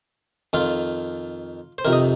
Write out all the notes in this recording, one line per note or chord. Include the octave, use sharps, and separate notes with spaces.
F2 D#3 F4
C5
F2 C3 D#3 A#4
D#5